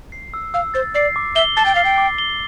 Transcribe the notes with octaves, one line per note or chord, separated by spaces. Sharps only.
C7
E6
F5 E6
C5 A6
D5 C7
D6
E5 G7
A5 A6
G5
F5 C7
G5
D6
G7